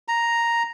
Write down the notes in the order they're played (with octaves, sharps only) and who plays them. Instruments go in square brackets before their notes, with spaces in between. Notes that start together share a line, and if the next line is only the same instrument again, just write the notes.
[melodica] A#5